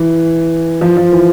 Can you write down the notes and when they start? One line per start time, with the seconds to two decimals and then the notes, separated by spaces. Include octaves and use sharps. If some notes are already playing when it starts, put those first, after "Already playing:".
Already playing: E3
0.81 F3
0.97 F3
1.12 E3